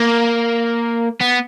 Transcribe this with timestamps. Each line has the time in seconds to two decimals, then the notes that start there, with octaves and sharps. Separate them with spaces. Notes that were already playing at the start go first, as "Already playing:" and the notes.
Already playing: A#3
1.21 B3